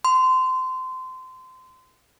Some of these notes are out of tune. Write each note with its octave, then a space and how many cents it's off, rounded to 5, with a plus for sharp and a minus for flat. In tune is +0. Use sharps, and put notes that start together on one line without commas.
C6 -25